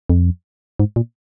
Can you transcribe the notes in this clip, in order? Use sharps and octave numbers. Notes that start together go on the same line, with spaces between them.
F2
G#2
A#2